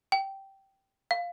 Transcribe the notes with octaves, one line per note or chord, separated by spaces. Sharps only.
G5
F5